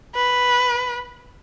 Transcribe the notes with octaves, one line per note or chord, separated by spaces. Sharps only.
B4